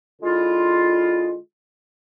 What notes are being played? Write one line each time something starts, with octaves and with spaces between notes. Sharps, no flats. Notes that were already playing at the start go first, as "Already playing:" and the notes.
D3 G#3 E4 F4